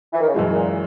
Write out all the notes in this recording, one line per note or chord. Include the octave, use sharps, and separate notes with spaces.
E3
D#3
C#3
F#2 B2 E3 G#3
A#2
A#2